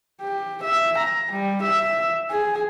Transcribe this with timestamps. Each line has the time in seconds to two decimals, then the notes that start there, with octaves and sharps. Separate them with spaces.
0.21 G4
0.63 E5
0.98 A#5
1.32 G3
1.62 E5
2.30 G#4